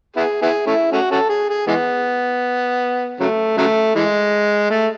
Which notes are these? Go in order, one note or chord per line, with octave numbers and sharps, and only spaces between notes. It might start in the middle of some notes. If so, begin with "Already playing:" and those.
B3 E4 G#4
B3 E4 G#4
A3 C#4 E4
A3 C#4 F#4
C#4 F#4 A4
G#4
G#4
E3 G#3 B3
C#3 F#3 A3
C#3 F#3 A3
E3 G#3
A3